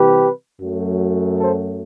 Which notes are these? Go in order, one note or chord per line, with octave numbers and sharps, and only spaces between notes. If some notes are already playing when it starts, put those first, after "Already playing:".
Already playing: C3 E3 G3 C4 G4 B4
F#2 F#3 A3
A4 C5